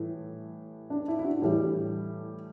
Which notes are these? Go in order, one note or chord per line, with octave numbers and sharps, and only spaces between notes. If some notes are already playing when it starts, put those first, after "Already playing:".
Already playing: A2 E3 G3
D4
E4
E4
D4 F#4
A2 E3 G3 E4